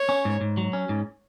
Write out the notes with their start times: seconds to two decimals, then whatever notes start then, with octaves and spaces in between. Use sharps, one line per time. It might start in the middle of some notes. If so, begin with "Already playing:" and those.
Already playing: C#5
0.09 C#4
0.25 G#2
0.41 G#2
0.57 F#3
0.73 C#4
0.89 G#2